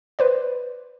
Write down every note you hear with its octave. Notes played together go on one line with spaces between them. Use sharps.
B4 C5 D5